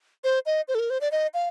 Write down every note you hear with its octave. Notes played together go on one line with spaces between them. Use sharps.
C5
D#5
C5
A4
A#4
C5
D5
D#5
F5